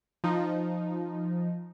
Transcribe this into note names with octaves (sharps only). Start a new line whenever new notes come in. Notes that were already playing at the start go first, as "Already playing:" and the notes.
F3 D#4